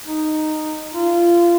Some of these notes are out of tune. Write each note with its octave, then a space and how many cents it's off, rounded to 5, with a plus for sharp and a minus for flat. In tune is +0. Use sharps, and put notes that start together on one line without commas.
D#4 -10
F4 -20